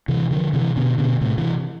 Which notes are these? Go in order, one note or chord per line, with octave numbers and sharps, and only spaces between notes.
C3 E3
D3 F3
C3 E3
B2 D3
B2 D3
A2 C3
C3 E3